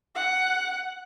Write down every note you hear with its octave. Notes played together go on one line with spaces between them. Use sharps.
F#5